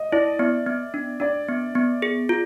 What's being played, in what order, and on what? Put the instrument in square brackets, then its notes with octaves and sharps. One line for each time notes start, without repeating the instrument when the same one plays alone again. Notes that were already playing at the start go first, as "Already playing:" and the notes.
Already playing: [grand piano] D#5
[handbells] E4 [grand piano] D5
[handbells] B3 [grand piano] D5
[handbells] B3
D4
[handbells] D4 [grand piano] D5
[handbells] B3
B3
G#4
F4